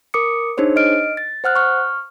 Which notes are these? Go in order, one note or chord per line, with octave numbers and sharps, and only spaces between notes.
A#4 D6 D#6 C#7
D4 D#4 G#4 C5 C#5
D#5 F6 D7
A6
C5 F#5 F6 F#6
C#6 F6